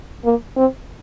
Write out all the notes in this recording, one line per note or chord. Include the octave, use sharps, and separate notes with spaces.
A#3
C4